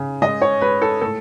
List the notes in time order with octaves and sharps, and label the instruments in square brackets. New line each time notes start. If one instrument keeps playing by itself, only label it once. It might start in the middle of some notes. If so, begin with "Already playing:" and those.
Already playing: [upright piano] C#3
G#3 D#5
C#5
G#3 B4
A4
A2 A4